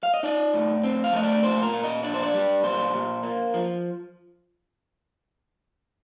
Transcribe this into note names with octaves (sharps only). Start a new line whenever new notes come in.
F5
D#5
D#4 D5
A2
C4
F5
A3 D#5
D5
A#2 C5
A#4
A#2
D#5
D4 D5
C5
D5
G3
A#2 C5
A#2
A#3
F3